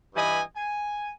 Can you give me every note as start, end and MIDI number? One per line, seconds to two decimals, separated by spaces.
0.15 0.40 43
0.15 0.40 52
0.15 0.40 67
0.15 0.40 75
0.15 0.40 80
0.15 0.40 83
0.56 1.11 80